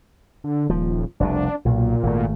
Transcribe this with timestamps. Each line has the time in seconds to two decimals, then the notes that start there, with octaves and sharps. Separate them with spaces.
0.44 D3
0.70 D#1 F3
1.20 F1 C2 B2 D4
1.65 B1 A#2
2.03 G#1 A3